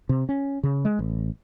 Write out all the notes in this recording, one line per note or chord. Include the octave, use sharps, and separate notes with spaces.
C3
C#4
C#3
G#3
A1